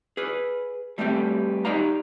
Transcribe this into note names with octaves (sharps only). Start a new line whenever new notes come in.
G#4 B4
G3 A3 B3 C4 F#4 G4
D#4 G4 D5 F5 A#5